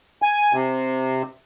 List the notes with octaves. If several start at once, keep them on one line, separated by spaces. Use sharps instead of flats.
G#5
C3